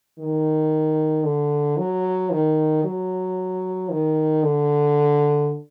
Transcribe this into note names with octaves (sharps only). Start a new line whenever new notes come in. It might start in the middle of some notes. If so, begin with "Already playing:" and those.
D#3
D3
F#3
D#3
F#3
D#3
D3